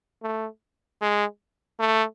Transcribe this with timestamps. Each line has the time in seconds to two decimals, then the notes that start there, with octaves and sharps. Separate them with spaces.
0.23 A3
1.01 G#3
1.79 A3